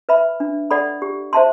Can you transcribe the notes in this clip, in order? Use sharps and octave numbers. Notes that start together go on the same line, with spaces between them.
B4 E5 B5
D4
A4 D5 F#5 B5
G4
C5 E5 A5 C6